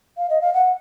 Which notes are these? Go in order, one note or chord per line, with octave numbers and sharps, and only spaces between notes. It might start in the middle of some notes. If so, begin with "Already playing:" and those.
F5
D#5
F5
F#5